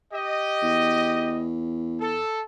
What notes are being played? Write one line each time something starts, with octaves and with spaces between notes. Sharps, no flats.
G4 D#5
E2
A4